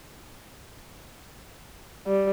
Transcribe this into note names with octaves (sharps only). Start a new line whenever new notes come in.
G3